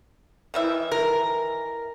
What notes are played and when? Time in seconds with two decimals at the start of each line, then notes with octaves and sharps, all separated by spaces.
0.54 D#3 E3 E5
0.92 A#4